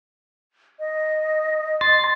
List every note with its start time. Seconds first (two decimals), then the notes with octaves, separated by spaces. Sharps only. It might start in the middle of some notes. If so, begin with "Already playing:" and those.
0.79 D#5
1.81 C6 A6